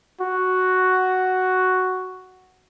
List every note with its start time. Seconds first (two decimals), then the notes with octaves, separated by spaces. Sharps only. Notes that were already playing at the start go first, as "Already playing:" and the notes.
0.21 F#4